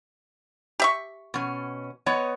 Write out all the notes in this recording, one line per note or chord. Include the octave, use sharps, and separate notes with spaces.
G4 E5 C#6
B2 C#4
B3 C#5 D#5